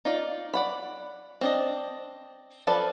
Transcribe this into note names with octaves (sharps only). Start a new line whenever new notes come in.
D#4 F4 D5
D5 F#5 B5
C4 D4 D#5
F3 A4 B4 D5